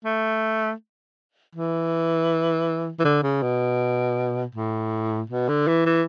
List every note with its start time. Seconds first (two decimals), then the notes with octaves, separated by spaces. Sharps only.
0.05 A3
1.55 E3
2.99 E3
3.05 D3
3.23 C#3
3.43 B2
4.54 A2
5.30 B2
5.48 D3
5.67 E3
5.86 E3